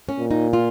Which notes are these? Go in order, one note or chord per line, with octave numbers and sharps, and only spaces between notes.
C#4
A#2
D#4
F4